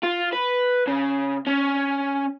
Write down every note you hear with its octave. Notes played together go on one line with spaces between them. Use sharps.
F4
B4
C#3
C#4